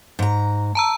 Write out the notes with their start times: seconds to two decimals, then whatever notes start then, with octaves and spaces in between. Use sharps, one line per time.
0.19 G#2 A#5
0.75 A5 A#5 E6